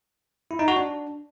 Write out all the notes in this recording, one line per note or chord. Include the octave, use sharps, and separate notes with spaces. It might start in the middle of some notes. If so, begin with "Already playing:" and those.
E4
D#4
F#4
D4